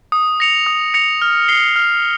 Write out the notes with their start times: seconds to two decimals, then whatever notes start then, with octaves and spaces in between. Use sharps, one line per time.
0.12 D#6
0.40 A#6 C#7 F7
0.66 D#6
0.94 A#6 C#7 F7
1.22 F6
1.48 C7 G7
1.76 F6